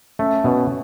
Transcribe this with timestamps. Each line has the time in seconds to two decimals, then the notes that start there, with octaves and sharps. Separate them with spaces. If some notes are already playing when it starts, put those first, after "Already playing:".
0.19 A3 C#4
0.44 B2 C#4